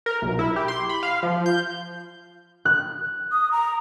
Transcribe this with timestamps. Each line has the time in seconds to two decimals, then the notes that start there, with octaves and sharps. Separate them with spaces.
0.06 A#4
0.22 B1
0.39 E4
0.56 G4
0.68 C6
0.89 B5
1.03 F5
1.23 F3
1.46 G6
2.65 F#6
3.32 D#6
3.52 A#5